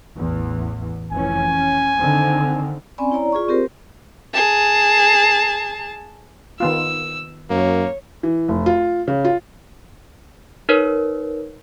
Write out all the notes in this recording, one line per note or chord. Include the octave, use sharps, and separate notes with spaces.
A1 E2 E3
F1 E3 C#4 G#5
C#4
D3 D#3 C4
C4 C#4 D5 G#5 B5
E4 C#5 D5 A#5
F4 G#4 D5 C#6
C4 G4 A#4 C5
G#4 A5
D#3 B3 F4 E6
F#2 A#3 C#5
E3
F1
F4
C#3
F4
D#4 A#4 B4 C#5